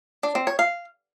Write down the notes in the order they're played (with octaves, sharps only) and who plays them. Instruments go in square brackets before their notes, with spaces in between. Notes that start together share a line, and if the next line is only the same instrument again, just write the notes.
[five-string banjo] D4
C4
C#5
F5